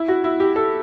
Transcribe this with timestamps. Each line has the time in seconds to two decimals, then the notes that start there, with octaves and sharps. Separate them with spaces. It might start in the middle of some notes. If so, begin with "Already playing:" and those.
Already playing: E4
0.08 F#4
0.24 E4
0.40 G4
0.56 A4